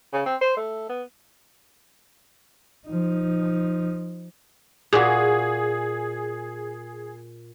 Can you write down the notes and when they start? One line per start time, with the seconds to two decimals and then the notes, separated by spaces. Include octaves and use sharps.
0.13 C#3
0.26 C4
0.41 C5
0.57 A3
0.89 B3
2.87 F3 D#4
4.93 A#2 F#4 G#4